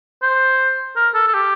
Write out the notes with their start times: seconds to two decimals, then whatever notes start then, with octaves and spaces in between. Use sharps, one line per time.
0.22 C5
0.96 A#4
1.14 A4
1.28 A4
1.34 G4